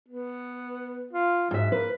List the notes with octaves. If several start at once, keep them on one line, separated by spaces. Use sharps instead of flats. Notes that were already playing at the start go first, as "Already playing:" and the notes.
B3
F4
G#2 F#3 E5
A#3 B4